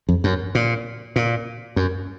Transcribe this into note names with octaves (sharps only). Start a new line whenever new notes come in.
F2
F#2
A#2
A#2
F#2